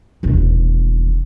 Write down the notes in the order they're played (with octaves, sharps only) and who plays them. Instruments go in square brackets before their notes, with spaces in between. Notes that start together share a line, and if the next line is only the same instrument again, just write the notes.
[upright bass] E1 D#2